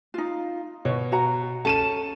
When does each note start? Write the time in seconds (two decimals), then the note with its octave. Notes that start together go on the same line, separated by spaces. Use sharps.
0.14 D#4 F4
0.85 B2 C#5
1.12 F#4 F#5 A#5
1.65 C#4 A4 A5 D#7 E7